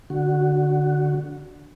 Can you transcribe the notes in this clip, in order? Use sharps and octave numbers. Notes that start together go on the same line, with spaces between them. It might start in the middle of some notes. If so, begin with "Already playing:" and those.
D3 F#4